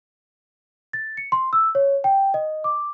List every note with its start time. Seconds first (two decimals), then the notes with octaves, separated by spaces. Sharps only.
0.93 A6
1.17 C#7
1.32 C6
1.53 E6
1.75 C#5
2.04 G5
2.34 D#5
2.64 D6